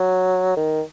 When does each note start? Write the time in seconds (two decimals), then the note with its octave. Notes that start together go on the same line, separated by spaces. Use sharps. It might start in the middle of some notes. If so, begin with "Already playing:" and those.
Already playing: F#3
0.56 D#3